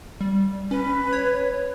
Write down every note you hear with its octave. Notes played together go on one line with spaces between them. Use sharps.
G3
C#4 B4
C#5